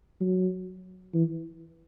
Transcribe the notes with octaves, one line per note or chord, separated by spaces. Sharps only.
F#3
E3